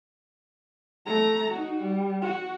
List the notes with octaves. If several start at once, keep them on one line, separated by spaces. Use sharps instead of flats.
A3 A#5
D#4 F#4
G3
F#4